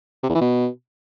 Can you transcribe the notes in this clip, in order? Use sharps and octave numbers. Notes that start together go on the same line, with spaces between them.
C3
E2
E3
B2